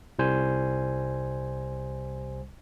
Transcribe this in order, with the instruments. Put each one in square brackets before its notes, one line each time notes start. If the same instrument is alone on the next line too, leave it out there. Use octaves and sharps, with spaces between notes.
[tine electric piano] C2 G3 C5 G#5